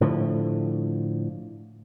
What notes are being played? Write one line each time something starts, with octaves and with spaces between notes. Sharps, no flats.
A2 D3 F3